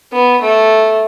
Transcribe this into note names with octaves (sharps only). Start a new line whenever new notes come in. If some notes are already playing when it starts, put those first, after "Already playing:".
B3
A3